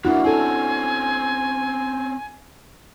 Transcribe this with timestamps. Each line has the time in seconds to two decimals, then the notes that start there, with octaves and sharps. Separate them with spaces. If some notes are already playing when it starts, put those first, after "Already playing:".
0.05 E3 A#3 D4 E4 F#4
0.24 C4 C#4 E4 A4 G#5